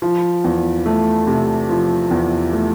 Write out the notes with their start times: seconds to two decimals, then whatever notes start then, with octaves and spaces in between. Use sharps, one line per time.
0.02 F3
0.44 E2
0.86 A3
1.27 C3
1.69 F3
2.11 E2
2.53 A3